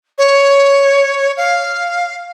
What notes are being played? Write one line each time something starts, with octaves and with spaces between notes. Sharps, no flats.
C#5
F5